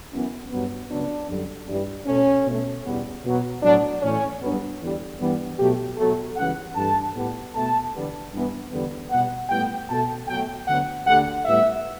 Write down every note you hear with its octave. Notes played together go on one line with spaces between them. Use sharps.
F#2 E3 B3
G2 F#3 B3
C#2 C#3 F#3 B3 D4
F#2 D3 G3
G2 E3 G3
B2 A3 C#4
B2 A3
E2 B2 G3 B3
B2 F#3 B3
A2 F#3 B3 D4
A2 E3 A3 C#4
G2 F#3 B3
E2 D3 G3
G2 E3 G3 B3
B2 F#3 A3 G4
B2 F#3 A3 A4
C#2 C#3 E3 G3 B3 F#5
G2 E3 A3 A5
A2 G3 B3
B2 A3 A5
E2 D3 G3 B3
G2 E3 B3
E2 D3 G3 B3
B2 G3 B3 F#5
A2 G3 B3 G5
B2 A3 A5
B2 F#3 A3 G5
D2 D3 F#3 B3 F#5
D2 D3 G3 F#5
A2 G3 B3 E5